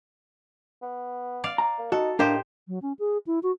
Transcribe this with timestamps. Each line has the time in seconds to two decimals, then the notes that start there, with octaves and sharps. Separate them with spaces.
0.82 B3
1.44 D5 F5
1.58 A#5
1.78 A#3
1.92 D#4 F#4 A4
2.19 A2 A#3 D4 G4 A#4 C5 D#5
2.68 F#3
2.82 C#4
2.99 G#4
3.27 E4
3.43 F#4